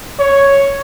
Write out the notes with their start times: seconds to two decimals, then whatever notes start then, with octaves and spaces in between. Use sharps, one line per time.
0.20 C#5